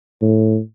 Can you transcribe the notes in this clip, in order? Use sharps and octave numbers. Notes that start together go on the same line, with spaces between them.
A2